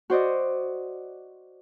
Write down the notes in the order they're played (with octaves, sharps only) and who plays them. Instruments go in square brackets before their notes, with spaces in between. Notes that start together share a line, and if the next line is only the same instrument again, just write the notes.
[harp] F#4 C5 D5 D#5